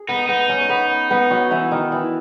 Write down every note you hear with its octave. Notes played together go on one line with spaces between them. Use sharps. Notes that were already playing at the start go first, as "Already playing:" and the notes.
Already playing: G#4
B3 D#4 B4
B3 D#4 B4
C#4 C#5
C#5
B3 B4
B3 B4
F#3 F#4
E3 E4
D#3 D#4
E3 E4